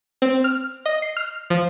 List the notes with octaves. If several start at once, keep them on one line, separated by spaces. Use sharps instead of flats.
C4
F6
D#5
C7
F6
F3